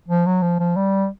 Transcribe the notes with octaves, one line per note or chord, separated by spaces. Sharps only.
F3
F#3
F3
F3
G3